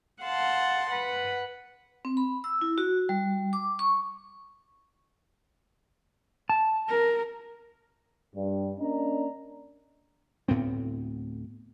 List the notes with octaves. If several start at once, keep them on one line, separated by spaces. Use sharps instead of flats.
F5 F#5 A5 C6
B4 F#5
C4
B5
E6
E4
F#4
G3
D6
C#6
A5
A#4
G2
A#3 C#4 D4 D5 D#5 A#5
D2 A2 B3 C4